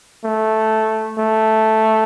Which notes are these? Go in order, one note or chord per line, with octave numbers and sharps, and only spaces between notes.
A3
A3